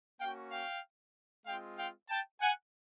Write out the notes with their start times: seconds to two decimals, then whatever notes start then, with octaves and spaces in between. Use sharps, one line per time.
0.20 A#3 C#4 F#4 F5 G5
0.51 F5 G5
1.46 G#3 C4 F4 F5 G5
1.78 F5 G5
2.09 G5 A5
2.41 F#5 G#5